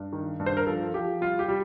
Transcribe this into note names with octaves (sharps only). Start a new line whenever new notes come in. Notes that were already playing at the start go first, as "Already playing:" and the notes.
Already playing: G2
D#3
G2
C5
A#4
F3 A4
F3 G4
G3 F4
G4
G3